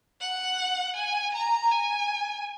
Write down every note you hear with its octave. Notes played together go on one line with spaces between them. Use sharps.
F#5
G#5
A#5
G#5